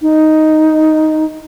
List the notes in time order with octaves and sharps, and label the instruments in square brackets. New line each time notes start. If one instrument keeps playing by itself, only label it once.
[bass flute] D#4